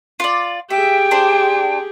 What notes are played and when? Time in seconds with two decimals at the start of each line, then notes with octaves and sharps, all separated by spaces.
0.20 F4 D5
0.70 G4 G#4 E5 G5
1.11 D4 C5